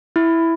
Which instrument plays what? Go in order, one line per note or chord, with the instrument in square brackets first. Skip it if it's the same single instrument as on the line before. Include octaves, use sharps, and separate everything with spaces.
[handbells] E4